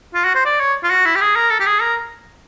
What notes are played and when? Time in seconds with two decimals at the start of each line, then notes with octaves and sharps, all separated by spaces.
0.14 F4
0.25 F#4
0.35 C5
0.45 D5
0.60 C#5
0.83 F4
0.90 F#4
1.06 E4
1.15 G4
1.21 G#4
1.36 A#4
1.50 A4
1.60 G4
1.66 G#4
1.81 A#4